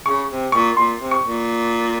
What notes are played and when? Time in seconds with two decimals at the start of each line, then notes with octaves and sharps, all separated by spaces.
0.06 C#3 C#6
0.30 C3
0.52 A#2 C#6
0.77 A#2 C6
0.99 C3
1.11 C#6
1.23 A#2